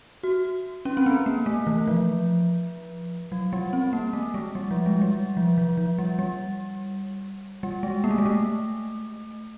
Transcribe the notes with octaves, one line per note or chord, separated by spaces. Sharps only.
F#4
C#4
C4
B3
A#3
A3
E3
F3
F#3
G3
C4
A#3
A3
G#3
G3
F3
G#3
G3
F3
F3
F3
G3
G3
G3
G#3
A#3
A3
G#3
A3